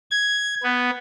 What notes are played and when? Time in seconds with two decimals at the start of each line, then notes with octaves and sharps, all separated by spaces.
0.11 G#6
0.63 B3